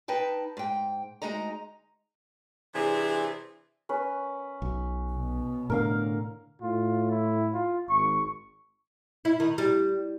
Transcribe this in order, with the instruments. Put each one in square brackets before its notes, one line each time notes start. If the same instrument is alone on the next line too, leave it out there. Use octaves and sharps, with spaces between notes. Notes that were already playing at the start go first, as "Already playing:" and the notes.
[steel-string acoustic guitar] D#4 B4 G5 A5
G#2 G5
D2 E3 G#3 D#4 D#5 A#5
[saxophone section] C3 E3 C4 D4 E4 G#4
[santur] C#4 B4
[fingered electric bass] B1
[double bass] B2
[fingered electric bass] A2 D3 [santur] A#4 F5
[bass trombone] A2 [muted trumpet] F4
[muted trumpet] E4
F4
[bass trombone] G#1 [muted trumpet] C#6
[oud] E4
D#3
G3